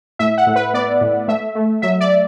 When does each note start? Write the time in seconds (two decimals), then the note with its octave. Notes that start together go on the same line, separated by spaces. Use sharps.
0.19 A2 E5
0.38 F#5
0.47 A2
0.56 B4
0.74 B3 D5
1.01 A2
1.28 A3 E5
1.55 A3
1.82 F#3 E5
2.01 D5